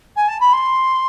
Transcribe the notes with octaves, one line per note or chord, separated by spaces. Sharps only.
G#5
A5
B5
C6